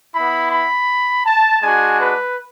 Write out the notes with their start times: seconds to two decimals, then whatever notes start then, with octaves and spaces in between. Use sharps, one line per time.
0.14 B3 E4 B5
0.51 B5
1.25 A5
1.62 G#3 D4 F#4 G#5
1.99 B4